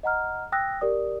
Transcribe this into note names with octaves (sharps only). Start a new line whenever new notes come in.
D#5 F#5 A#5 F6
G5 D#6 E6 F#6 A#6
G4 A#4 D5 D#6